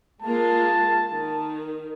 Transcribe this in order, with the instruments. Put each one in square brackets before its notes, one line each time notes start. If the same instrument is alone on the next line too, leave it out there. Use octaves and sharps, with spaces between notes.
[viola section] G#3 A#3 F4 [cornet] A5
[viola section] D#3